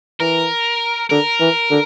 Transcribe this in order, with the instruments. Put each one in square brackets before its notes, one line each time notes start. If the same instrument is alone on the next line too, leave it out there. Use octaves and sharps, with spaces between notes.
[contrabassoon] E3 [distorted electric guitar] A#4
[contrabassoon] D3 [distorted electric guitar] A#4
[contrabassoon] E3
D3